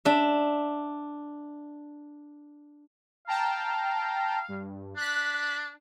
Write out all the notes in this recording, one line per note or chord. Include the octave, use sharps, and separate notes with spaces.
D4 E5
F5 G5 A5 A#5
G2
D4 F#6 B6